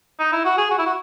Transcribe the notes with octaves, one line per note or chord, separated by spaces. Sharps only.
D#4
E4
F#4
G#4
F#4
E4
F#4